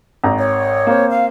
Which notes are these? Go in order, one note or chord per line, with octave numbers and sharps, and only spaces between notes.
G#1 A#5
C#5
A#3 C4
F5